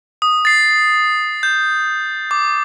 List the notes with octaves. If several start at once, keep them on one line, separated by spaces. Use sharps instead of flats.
D#6
A6 C7
G6
D6